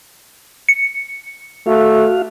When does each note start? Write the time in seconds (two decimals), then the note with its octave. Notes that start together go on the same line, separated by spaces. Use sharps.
0.69 C#7
1.67 A3 F#4 F5